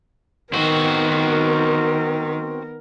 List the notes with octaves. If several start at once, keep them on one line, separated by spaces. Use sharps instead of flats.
D#3 B3 C4 F#4 A#4